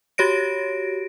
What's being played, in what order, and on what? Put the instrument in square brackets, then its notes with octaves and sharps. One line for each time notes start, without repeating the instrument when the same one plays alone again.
[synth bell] F#4 G4 C#5 A#6 D7